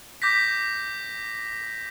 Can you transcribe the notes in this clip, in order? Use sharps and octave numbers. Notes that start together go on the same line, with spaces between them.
D6 G6 A#6 B6